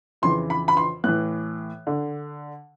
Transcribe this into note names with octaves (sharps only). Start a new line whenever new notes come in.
F2 C#3 E3 C6
B5
B5
C6
A2 E3 F#6
D3